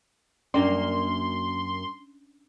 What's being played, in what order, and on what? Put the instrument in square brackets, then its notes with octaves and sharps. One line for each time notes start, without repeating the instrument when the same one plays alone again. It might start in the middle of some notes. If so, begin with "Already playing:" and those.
[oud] F#2 A#3 D5 [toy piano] C#4 D4 [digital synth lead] C6